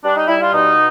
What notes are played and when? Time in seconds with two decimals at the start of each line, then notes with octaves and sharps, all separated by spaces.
0.04 G3 D4
0.15 D#4
0.27 G3 E4
0.40 F4
0.52 B2 D#4